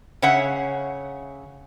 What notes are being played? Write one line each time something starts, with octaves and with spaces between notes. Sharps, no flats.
C#3 C#5 E5 F#5